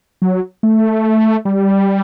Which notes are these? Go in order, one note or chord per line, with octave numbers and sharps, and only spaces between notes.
F#3
A3
G3